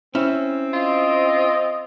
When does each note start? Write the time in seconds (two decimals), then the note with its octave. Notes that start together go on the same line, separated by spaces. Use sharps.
0.15 C4 C#4 E4
0.73 F4 D#5